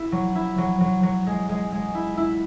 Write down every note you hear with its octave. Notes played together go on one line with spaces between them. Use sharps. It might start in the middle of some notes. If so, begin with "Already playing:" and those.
Already playing: E4
F#3
E4
F#3
F#3
F#3
G#3
G#3
G#3
E4
E4